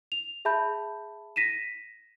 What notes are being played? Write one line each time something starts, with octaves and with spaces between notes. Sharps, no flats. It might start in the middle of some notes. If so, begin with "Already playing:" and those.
F7
G#4 E5 A5 B5 G6
A#6 B6 D#7 E7